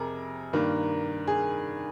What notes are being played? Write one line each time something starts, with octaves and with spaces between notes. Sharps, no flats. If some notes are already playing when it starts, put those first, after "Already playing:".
Already playing: F2 C3 G#4 A#4
G2 D#3 A#3
G#4